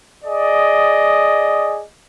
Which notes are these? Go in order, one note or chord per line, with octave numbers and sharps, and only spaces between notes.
G#4 D5 D#5